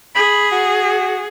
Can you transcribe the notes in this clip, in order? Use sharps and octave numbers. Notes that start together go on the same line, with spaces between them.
G#4 B5
F#4